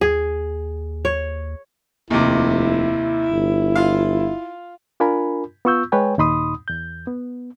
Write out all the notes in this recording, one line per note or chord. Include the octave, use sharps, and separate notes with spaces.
D#2 G#4
C#5
F1 D#2 C3 E4
G1
F4 F5
D4 F4 A#4 G#5 B5
B3 F4 C#6 E6 G6
G#3 B4 C#5 G5 G#5
D#2 A#2 D#4 B5 C6 D#6
E2 G6
B3